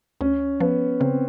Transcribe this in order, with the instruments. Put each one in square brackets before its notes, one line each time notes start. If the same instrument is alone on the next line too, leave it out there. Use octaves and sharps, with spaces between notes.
[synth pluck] D2 [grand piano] C#4
[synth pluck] F3 [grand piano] B3
[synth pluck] C#3 [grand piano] C4